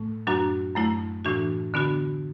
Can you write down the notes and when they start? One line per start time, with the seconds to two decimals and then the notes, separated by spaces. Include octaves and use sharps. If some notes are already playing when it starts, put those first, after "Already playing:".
Already playing: A2 A3
0.27 F#2 F#3 D4 F#4
0.75 F#2 F#3 A3 E4
1.25 A2 E3 D4 F#4
1.74 D3 B3 D4 F#4